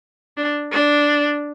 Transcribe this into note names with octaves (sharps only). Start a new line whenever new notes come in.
D4
D4